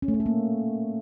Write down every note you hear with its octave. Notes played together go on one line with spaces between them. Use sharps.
C#4
A3
C#4
A4
A#3